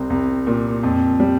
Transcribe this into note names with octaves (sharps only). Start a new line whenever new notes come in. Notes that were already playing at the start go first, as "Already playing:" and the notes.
Already playing: C2 C4
C2
A#2
F2
G3